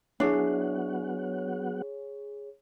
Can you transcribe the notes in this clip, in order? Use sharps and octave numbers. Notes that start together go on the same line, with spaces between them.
F#3 B3 D4 E4 G#4 C#5 F#5